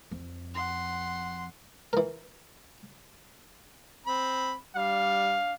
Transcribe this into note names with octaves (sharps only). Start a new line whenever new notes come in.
F2
F#5 C6
E3 A#4
C4 B5
G3 D4 F5